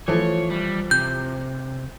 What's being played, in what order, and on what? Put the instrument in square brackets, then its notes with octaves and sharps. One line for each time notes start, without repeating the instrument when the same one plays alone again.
[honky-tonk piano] E3 F3 A3 [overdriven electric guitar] C#5
[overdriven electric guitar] G3
[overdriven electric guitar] C3 [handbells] G6